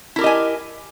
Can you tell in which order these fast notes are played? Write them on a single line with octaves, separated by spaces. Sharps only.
E4 A#4 G4 D#5 G#5